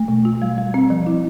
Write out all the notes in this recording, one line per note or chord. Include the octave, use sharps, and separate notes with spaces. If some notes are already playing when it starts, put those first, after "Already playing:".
Already playing: A3
B2
F4
G3
G3
C4
F3
E4